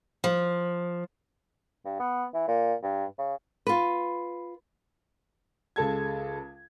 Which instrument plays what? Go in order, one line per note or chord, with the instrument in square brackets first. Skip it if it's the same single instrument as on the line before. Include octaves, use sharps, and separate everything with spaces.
[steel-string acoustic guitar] F3
[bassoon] G2
B3
E3
A#2
G2
C#3
[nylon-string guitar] F4 B4
[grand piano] C#2 G#3 A4 A5 G#6